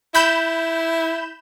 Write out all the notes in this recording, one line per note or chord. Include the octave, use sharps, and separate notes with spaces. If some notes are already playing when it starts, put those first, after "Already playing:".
E4 B5 G6 E7